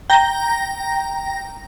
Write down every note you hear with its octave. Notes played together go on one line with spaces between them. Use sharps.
G5 A#5 A#6